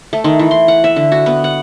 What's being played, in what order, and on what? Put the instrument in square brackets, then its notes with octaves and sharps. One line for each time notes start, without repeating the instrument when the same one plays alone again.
[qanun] A3
D#3
E3
C6
F#5
E5
D3
F#4
B3
F#5